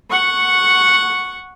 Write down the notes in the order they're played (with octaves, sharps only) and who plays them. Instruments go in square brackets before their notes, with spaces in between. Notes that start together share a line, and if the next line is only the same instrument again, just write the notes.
[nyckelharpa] F#5 C#6